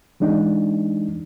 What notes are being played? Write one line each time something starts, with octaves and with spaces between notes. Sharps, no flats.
E3 G#3 D4 D#4